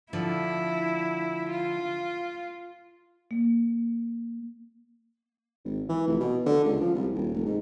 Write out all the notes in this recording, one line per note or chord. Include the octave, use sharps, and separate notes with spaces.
D3 F3 E4
F4
A#3
G#1
E3
F1
B2
D3
C#2
F3
C2
D#1
F1
G#2